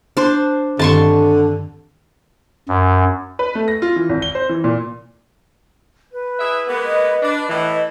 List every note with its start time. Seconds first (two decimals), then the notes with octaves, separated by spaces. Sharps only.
0.17 D4 C5
0.79 G2 D3 D#3 C4 A5 C6 C#6
2.68 F#2
3.39 B4
3.55 A3
3.68 A#6
3.82 F4
3.96 E3
4.09 G#1
4.22 G7
4.35 C5
4.49 E3
4.64 A#2
6.12 B4
6.39 E4 G#4 E5
6.67 G#3 A#3 B3
6.85 D#5
7.22 D4
7.49 A2 E3 D#5